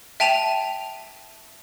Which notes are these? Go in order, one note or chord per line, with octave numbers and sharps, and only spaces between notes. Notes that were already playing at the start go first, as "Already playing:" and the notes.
E5 G5 A5 D#7 F7